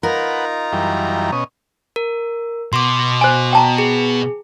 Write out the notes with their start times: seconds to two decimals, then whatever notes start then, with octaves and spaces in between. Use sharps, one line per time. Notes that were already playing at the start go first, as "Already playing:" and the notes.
0.03 D#4 F4 A#4 B4 F#5 A#5
0.73 F#2 E3 G3
1.32 B2 C#4 D#5
1.96 A#4
2.73 B2 C6 D6
3.21 C5 G#5
3.53 G5 A5 A#5
3.78 G#4